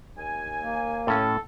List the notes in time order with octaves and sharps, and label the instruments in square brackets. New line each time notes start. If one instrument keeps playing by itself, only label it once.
[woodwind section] D#2 G#5
[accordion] A#3
[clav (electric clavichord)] A2 C#4 [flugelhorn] A4